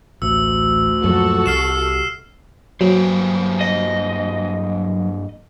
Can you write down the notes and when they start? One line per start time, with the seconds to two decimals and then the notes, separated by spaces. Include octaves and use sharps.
0.22 A1 D2 E6
1.04 F#2 A#2 F3 F#4 A4
1.46 C2 C3 F6 C7 E7
2.81 G2 F#3 A#3 C5
3.61 D#5